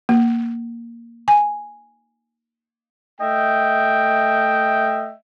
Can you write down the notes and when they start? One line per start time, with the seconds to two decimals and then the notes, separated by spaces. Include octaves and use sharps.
0.09 A#3
1.28 G#5
3.21 A3 D#5 E5 G5